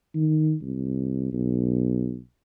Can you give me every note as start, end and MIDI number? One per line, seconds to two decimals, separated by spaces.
0.15 0.55 51
0.62 1.28 36
1.32 2.19 35